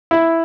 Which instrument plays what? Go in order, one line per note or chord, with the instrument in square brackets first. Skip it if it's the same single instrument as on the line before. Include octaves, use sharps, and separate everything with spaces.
[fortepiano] E4